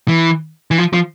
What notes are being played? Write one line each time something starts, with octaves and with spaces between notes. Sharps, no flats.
E3
E3
F3
F3